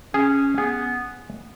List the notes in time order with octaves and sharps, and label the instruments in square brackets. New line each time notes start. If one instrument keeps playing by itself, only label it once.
[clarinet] C#4 [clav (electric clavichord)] G#4
[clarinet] B3 [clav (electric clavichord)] G#4